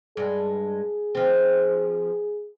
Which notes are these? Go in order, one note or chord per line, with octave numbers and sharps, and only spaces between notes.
G2 G#3 G#4
F3 C4